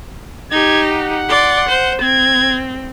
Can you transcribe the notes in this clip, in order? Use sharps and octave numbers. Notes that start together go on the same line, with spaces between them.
D#4 G4 G#6
F#5
D5 C6
C5
C4 G#6